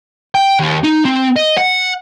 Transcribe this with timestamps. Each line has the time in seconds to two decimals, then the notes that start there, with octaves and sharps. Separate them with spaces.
0.35 G5
0.59 D#2
0.83 D#4
1.05 C4
1.36 D#5
1.58 F#5